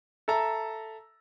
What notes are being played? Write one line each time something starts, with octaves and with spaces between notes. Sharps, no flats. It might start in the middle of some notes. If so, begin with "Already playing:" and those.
A4 E5 A5 A#5